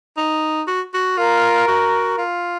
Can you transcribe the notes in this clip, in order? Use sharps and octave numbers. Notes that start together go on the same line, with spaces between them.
D#4
F#4
F#4
F4 A#4
F#4
F4